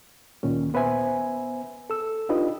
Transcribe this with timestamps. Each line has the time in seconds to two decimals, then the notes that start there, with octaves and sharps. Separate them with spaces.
0.43 D2 A#2 D#3 C#4
0.74 B3 B4 C5 E5 G#5
1.90 A4 E6
2.29 D4 D#4 F4 G4 B4 D#5